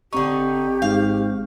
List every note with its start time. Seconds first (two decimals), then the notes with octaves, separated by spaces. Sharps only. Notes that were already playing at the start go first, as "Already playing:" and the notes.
0.13 G#1 D3 C4 D#4 G4 C#6
0.82 G#2 F5